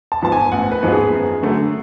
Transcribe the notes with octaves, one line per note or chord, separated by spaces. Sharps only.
A5
G#2 F3 B3 A5
G#5
A1 F#5
B4
G#2 F3 B3
G#4
F#2
D3 F#3 A3